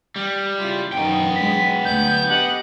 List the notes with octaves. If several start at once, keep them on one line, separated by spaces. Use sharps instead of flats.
G3
C#3 E4 F4
F#2 D#3 B3 D#4 G5
F#3 G#3 B6
D2 F#3 G6
G4 A4 D#5 F#5